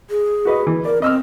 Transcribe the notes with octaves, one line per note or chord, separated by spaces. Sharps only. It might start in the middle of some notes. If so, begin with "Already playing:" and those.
G#4
F#4 B4 D#5
E3
A#4 D5
C4 D#5 E6 F6